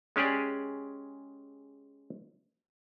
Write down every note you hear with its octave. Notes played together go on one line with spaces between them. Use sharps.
G#3 C#4 G4 G#4 D5